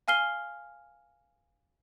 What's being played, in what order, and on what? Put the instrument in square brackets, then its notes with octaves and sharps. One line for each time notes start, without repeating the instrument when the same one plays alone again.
[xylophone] F5 G#5 F6 C7 G7